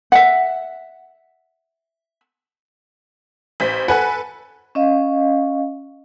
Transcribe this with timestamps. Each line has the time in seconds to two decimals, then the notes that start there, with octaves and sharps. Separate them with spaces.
0.12 E5 F#5
3.60 A1 C5 B6
3.88 A4 B4 F#5 G#5
4.75 C#4 D#5 F5